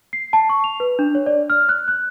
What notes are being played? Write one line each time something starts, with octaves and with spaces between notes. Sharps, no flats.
C7
A5
C#6
F7
B4
D4
C#5
D5
F6
F#6
F#6